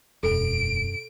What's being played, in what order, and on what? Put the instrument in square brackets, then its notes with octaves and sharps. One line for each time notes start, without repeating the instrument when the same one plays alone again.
[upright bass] E1 [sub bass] F#2 [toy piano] A4 [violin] D7